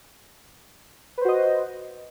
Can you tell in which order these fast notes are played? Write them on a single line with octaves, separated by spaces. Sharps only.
B4 C5 F#4 D#5